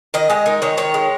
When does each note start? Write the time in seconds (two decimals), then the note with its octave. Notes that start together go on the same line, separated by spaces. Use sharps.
0.14 D#3 D#5
0.30 G#3 D#5
0.46 D#4 A#4
0.62 D#3 C#5
0.77 D#3 C#5
0.94 G#3